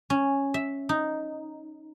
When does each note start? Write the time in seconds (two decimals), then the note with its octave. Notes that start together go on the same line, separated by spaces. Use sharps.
0.10 C#4
0.54 E5
0.89 D#4